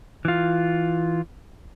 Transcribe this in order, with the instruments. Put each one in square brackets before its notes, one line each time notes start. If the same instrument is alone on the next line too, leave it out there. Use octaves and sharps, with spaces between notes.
[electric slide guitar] E3 F4